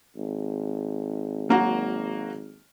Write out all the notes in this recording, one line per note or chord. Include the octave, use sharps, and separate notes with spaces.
G#1
F#3 A#3 F#4